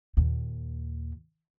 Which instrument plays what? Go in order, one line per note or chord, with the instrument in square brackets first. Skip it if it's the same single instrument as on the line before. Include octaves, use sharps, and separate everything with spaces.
[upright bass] D#2 A#2